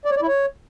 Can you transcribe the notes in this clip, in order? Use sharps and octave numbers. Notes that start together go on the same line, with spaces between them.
D5
C#5
D5
E4
C#5